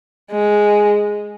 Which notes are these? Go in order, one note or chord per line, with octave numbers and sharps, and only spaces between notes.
G#3